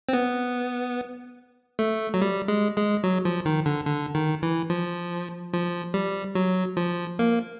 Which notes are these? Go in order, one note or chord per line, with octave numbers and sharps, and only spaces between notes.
C4
B3
A3
F#3
G3
G#3
G#3
F#3
F3
D#3
D3
D3
D#3
E3
F3
F3
G3
F#3
F3
A#3